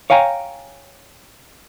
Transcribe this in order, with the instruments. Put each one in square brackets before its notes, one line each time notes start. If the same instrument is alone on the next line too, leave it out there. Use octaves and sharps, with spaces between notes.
[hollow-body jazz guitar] C#5 F5 G5 G#5 A#5